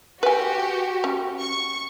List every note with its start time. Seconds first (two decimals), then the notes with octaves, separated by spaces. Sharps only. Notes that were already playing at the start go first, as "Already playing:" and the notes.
0.23 F#4 G4 B4 G#5
1.04 C#4
1.41 C#6